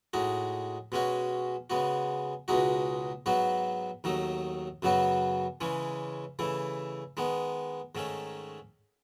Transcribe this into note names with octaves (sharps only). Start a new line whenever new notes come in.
A2 G#3 D#4 F#4
B2 G#3 C#4 F#4
C#3 G#3 B3 F#4
C#2 B2 G#3 D#4 F#4
G#2 F#3 B3 F#4
D#2 D#3 F#3 A3 D#4
F#2 C#3 F#3 B3 F#4
C#3 E3 G#3 C#4
C#3 E3 A3 E4
D#3 G#3 B3
G#2 D#3 A3 C#4